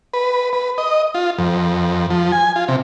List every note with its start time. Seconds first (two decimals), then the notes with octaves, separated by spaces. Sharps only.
0.14 B4
0.53 B4
0.78 D#5
1.15 F4
1.38 F2
2.10 F3
2.32 G#5
2.56 F4
2.68 C3